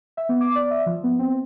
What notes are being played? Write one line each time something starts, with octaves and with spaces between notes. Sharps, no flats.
E5
B3
D6
D5
E5
F3
B3
C4